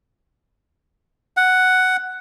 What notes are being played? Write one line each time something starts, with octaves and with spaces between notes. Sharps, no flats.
F#5